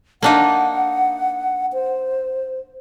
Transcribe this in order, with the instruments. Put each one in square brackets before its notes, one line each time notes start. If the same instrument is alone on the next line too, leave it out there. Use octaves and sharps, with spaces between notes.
[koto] A#3 D4 D#4 [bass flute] F#5
[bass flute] C5